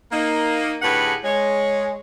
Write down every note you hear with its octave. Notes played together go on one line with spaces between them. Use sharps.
A#3 D#4
A2 D3 G4 G#4 B4 F#5
G#3 C#5